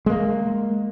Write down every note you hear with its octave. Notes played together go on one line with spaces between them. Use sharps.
G#3 A#3